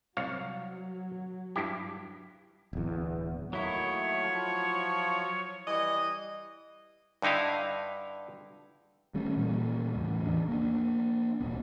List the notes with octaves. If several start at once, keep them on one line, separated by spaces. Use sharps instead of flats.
C2 F#3 C#5 F5
G2 E4 G4
D1 E2
D#3 F#3 A3 A#3 E4 C#5
F3
E3 G3 D#5
G2 D3 D#4 E4 F5
D#3 G3 A3 C#4
A#2 E3 G3 A#3
E2 A2 C#3
E3 D4
A#3 D4
E1 C2 A#2 B3